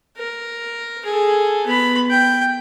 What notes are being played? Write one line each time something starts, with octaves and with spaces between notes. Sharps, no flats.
A#4
G#4 A4
B3 B5
G5